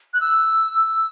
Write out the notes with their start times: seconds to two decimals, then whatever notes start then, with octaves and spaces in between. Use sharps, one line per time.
0.14 F#6
0.21 E6